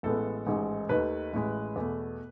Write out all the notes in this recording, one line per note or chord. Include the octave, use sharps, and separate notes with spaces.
A1 A2 G#3 B3 A4
A1 G#2 D#3 G#3
D#2 D#3 A3 B4
A1 A2 G#3
E2 B2 A3